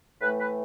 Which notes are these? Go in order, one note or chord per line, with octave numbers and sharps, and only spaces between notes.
A2 E3 A3 B4
B4